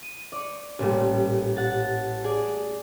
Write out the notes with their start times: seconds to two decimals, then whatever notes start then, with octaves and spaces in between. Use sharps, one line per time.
0.02 D#7
0.32 D5 C#6
0.79 A1 A#2 G3
1.57 F#5 A6
2.24 G#4 D5